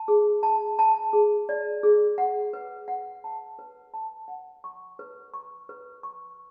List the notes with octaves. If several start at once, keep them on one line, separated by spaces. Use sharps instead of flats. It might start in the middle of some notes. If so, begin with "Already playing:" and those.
Already playing: A5
G#4
A5
A5
G#4
D5
G#4
F#5
B4
F#5
A5
B4
A5
F#5
C#6
B4
C#6
B4
C#6